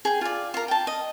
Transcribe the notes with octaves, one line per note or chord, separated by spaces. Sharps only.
G#4 G5
F4 D5
F4 A#4
G5 A5
D#5